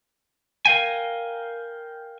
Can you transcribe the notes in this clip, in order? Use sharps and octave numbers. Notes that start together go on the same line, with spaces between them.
A#4 F5 G5 G#5